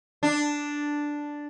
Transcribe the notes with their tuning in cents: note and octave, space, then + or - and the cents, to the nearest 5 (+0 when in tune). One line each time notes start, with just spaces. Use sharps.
D4 +0